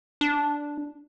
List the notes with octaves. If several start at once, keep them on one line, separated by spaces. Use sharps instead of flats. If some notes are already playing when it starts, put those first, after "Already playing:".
D4